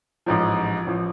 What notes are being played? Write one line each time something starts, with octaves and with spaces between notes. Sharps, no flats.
A1 G#2 F3
A1 F3